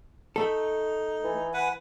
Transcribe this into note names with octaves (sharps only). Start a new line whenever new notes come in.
A3 D#4 A4
E3
B4 F#5 G#5